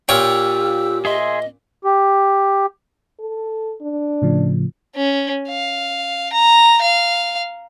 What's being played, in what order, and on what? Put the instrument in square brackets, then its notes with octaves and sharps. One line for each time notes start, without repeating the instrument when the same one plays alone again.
[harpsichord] A#2 C#5 [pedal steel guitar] F4 G5 [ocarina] G4 [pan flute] E6
[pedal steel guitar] G#4 E5 C6 [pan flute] D#5
[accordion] G4
[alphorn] A4
D4
[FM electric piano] A2 C#3 F3
[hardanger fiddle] C#4
F5
A#5
F5